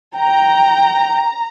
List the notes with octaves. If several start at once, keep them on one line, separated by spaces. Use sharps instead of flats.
G5 A#5